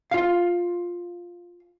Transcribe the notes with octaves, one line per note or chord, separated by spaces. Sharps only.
F4 F5